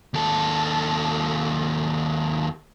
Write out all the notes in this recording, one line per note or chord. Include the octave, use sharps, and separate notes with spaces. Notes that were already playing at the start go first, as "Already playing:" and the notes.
D#2 A4